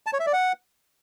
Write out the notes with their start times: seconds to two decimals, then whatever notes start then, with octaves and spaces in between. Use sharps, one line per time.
0.06 A5
0.13 C#5
0.20 E5
0.26 D5
0.33 F#5